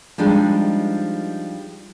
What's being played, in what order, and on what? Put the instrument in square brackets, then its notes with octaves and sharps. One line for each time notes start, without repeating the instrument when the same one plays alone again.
[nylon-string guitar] F3 G3 G#3 D4 D#4